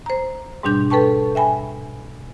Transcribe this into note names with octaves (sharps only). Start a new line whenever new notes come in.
C5 A#5
G#2 B2 G3 D4 G6
A4 B4 G5 A5 C#6
E5 G5 G#5 B5